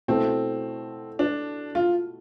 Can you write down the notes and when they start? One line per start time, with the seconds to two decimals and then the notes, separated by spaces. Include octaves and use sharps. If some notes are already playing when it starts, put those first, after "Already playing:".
0.08 B2 A3 C4 E4 A4
1.19 D4
1.75 F4